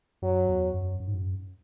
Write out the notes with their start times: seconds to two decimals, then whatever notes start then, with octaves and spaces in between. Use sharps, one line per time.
0.22 F#2 F#3
0.49 E2
0.74 F#2
1.00 F#2
1.07 G#2
1.14 F#2